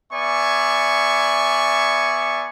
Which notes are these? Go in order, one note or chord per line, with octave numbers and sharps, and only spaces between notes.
B3 D5 E5 G#5 C#6